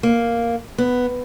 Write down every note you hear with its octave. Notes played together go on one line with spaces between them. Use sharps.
A#3
B3